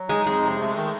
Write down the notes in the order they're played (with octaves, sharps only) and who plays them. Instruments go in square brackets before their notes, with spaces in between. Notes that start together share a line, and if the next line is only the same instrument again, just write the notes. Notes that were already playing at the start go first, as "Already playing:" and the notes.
Already playing: [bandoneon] F#3
[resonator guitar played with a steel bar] G#3 [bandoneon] D#4
[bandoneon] F2 [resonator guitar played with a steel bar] G#3
[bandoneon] C3
A3
D#3